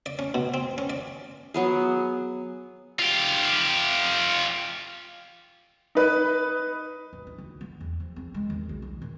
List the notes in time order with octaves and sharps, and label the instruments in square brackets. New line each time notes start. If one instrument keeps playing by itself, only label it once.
[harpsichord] D5
C#4
B2
C4
C#4
D5
[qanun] F#3 B3 G#4
[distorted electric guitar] F4 G4
[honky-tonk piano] D#4 B4
[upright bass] D1
D4
D2
B3
E2
F3
C4
G#3
D#2
B1
D#2
A#2